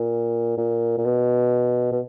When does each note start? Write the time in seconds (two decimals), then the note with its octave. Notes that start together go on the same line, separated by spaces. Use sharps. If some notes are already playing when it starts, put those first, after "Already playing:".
Already playing: A#2
0.58 A#2
0.98 A#2
1.05 B2
1.92 B2